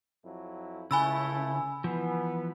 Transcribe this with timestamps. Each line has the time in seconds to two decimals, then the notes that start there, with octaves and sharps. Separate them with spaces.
0.25 F2 F#3 E4
0.91 C#2 C#3 A3 E4 G#5 B5 E6
1.84 E3 F3 B3